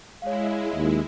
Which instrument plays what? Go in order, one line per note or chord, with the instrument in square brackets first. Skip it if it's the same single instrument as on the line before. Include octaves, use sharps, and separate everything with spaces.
[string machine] G#3 E4 [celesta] C#5 F5
[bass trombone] D#2